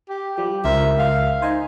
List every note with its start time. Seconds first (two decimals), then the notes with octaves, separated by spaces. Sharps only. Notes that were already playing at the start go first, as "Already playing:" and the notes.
0.09 G4
0.38 F3 G3 G4
0.64 C#2 A#4 C5 E5
0.99 F5
1.42 D#4 C5 G#5